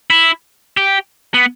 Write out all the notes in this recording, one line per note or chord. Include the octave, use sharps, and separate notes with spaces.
E4
G4
B3